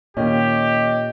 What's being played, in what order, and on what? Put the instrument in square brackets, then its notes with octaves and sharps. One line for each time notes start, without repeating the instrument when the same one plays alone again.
[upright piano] D#2 C#4 [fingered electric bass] A#2 [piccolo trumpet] G4 [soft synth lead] D#5